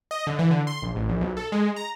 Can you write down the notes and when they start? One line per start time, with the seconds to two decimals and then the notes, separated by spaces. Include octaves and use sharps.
0.11 D#5
0.27 D3
0.39 E3
0.51 D3
0.67 C6
0.82 A#1
0.95 A1
1.09 A#1
1.21 B1
1.37 A4
1.52 G#3
1.76 A#5